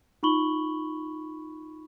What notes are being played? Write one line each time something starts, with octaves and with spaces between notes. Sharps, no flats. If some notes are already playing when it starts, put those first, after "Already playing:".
D#4 F4 B5 C#6 F#7 G7